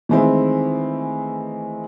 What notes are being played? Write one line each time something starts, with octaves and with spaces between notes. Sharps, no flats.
D#3 E3 G#3 A3 C4 E4